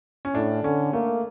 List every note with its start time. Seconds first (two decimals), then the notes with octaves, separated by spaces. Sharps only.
0.25 C#4
0.35 A2 D4
0.63 D3 C#4
0.93 A3 A#3